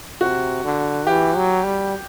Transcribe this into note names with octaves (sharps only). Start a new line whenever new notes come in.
C3 F#4
D3
E3 G4
F#3
G3